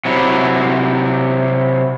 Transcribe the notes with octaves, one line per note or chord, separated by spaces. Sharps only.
C3 F#3 E4